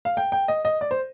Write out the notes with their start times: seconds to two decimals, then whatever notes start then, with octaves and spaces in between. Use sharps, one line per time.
0.05 F5
0.17 G5
0.32 G5
0.48 D#5
0.65 D#5
0.81 D5
0.91 C5